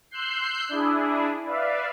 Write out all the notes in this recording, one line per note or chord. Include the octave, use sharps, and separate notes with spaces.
C6 E6 F#6 G6 C7
D4 E4 G#4
B4 D5 E5 F5